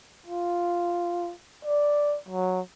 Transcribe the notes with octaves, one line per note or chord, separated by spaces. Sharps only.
F4
D5
F#3